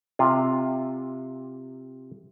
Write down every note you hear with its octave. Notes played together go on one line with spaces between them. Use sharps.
C3 F4